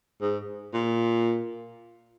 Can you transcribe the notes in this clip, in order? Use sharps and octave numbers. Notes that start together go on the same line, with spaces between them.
G#2
A#2